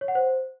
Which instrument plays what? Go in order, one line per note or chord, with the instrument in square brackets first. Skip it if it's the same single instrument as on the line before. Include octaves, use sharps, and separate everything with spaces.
[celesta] C#5
F#5
C5